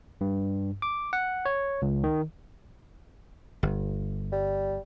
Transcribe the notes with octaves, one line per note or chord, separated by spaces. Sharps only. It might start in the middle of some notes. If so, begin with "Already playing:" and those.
G2
D6
F#5
C#5
C#2
D#3
G1
G3